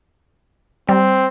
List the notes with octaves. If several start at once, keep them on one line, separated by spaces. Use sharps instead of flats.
G3 C4